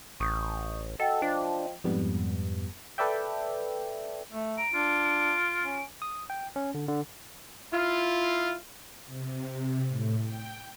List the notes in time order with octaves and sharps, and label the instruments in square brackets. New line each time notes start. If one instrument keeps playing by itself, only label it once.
[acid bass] A1 [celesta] C#6 D#6 G6
[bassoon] F#4 [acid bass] A4 [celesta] D#5 G5
[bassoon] F3 [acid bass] D4
[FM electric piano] F2 G#2 G3 B3
A4 B4 D5 E5 G5
[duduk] A3
[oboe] A#5 [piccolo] D7
[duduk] D4 [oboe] F4
[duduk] C#4
[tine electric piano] D#6
G5
C#4
D3
D3
[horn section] E4 F4
[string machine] C3
A2
G5